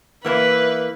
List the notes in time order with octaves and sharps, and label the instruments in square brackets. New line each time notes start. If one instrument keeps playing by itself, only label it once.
[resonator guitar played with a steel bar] E3 A#3 E4 [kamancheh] B4